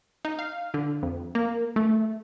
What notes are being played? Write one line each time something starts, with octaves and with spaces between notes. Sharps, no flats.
D#4
F5
D3
F2
A#3
A3